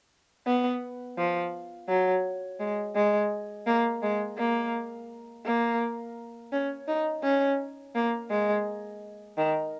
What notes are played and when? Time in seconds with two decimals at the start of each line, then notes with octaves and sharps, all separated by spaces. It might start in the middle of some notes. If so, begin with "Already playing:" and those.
0.46 B3
1.17 F3
1.88 F#3
2.59 G#3
2.95 G#3
3.66 A#3
4.02 G#3
4.37 A#3
5.45 A#3
6.52 C#4
6.88 D#4
7.23 C#4
7.95 A#3
8.30 G#3
9.37 D#3